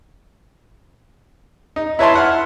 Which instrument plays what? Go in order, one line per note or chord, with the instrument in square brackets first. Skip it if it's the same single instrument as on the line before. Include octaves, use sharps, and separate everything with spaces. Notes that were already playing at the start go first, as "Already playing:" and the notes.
[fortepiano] D#4
E4 B4 C#5 E5 A5 C6
E5 F#5 F6